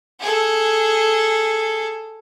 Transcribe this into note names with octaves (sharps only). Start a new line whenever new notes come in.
G#4 A4